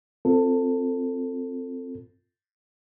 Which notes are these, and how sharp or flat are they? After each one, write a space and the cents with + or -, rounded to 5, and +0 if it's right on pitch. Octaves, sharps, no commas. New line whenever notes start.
C4 +0 F4 +0 A4 +20